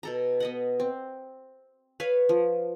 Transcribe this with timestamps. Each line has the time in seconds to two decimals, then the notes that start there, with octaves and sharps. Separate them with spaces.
0.03 B2 A4 A#5
0.40 B3 D#5 F#5
0.80 C4
2.00 B4 C#5 F5
2.29 F3